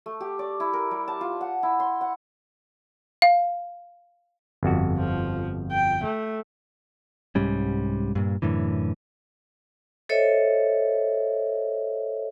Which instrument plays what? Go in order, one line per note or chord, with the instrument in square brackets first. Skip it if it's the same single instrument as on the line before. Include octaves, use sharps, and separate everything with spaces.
[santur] A3
G4
D5
E4
A#4
G3
A5
F4
F#5
E4
C6
F#5
[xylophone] F5
[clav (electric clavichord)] G1 F2 F#4
[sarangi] F3
G5
A3
[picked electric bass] C2 G#2 G3 C#4
G2 A#2
F#2 A2 D3 E3
[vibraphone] A4 C5 C#5 D#5 E5